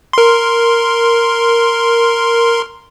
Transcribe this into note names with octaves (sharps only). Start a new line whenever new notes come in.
A#4 C6